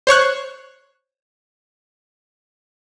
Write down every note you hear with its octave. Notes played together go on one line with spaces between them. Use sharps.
C5 C#5 C#6 F#6